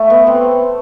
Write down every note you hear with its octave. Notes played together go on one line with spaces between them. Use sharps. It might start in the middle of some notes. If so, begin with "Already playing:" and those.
Already playing: A3
B3
C4